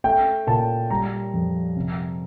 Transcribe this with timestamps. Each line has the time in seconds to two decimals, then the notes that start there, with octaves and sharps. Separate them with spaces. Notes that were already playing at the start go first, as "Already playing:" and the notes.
0.04 A3 G5
0.47 A#2 A5
0.90 G3 A#5
1.34 F2
1.76 C3